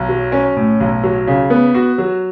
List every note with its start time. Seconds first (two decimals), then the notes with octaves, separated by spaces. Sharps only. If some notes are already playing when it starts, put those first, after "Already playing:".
Already playing: B1
0.09 F#3
0.32 C#4
0.57 A2
0.81 B1
1.03 F#3
1.27 C#3
1.50 B3
1.74 F#4
1.98 F#3